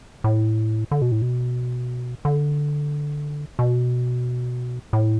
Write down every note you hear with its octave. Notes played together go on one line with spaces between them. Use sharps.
A2
D3
B2
A2
B2
D3
B2
A2